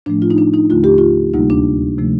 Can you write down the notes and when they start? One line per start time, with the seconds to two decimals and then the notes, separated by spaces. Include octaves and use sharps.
0.06 A2 F3 A3 D4
0.22 F4
0.30 D#4
0.38 D4
0.54 D#4
0.70 D#2 D3 A3 F4
0.84 G4
0.98 F4
1.34 D2 C3 G3 A#3 D#4
1.50 D4
1.98 C3 F3 A3